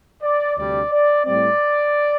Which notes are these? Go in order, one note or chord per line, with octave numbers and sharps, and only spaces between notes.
D5
D2 C3 G3 D4 D5
D5
A2 G3 C4 D5